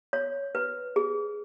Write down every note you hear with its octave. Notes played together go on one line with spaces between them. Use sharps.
C#5
B4
G#4